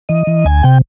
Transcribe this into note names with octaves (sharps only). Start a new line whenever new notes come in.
E3 D#5
E3
D2 G#5
C3 G5